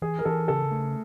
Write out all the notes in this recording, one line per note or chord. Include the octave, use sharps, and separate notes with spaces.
E3 G#4
A#4
E3 A4
C#3 A4
A3